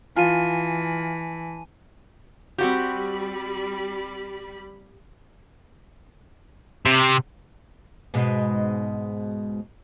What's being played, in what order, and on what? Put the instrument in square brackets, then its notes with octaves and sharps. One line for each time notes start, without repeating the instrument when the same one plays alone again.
[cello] E3 [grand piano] F4 [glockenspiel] G#5 A5 D#7
[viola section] G3 B5 [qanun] C4 F#4 G4
[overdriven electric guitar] C3
[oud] G#2 B2 G#3